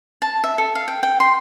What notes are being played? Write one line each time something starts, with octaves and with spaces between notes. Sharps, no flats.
A5
E5
A4
F5
G5
G5
C6